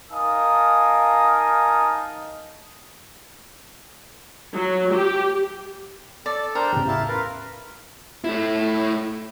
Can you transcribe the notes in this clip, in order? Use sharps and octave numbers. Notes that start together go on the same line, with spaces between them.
D#4 A#4 F5 G#5 A5 D#6
F#3
G4
A4 D5
D4 A#4 C5 G5
A1 E2 G4
E4 F5 A5
A#4 B4 F5 C6 A6
A3 E4